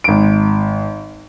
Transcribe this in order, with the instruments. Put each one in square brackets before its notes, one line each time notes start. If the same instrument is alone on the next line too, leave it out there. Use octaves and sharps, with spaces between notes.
[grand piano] G#1 D7